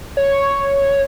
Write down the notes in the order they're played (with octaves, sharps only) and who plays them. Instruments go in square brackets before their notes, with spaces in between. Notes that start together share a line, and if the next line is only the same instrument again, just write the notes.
[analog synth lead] C#5